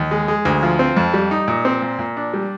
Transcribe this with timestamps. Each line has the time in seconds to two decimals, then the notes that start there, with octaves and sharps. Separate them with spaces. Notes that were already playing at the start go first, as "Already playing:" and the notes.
Already playing: D#2
0.11 G#3
0.28 G#3
0.45 D2
0.63 F3
0.79 C4
0.97 F2
1.14 G3
1.31 D#4
1.48 A#2
1.65 C4
1.82 A#2
1.99 A#2
2.17 D4
2.34 G3